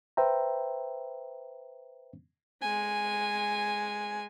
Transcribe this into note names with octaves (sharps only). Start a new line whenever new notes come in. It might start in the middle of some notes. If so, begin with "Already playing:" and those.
B4 C5 E5 G5 A#5
G#3 G#5